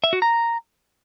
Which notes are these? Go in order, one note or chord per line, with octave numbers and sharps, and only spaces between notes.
E5
F#4
A#5